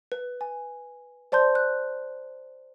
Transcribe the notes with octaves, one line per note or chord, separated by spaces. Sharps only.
B4
G#5
C5 D5 A5 C6 G6
F#6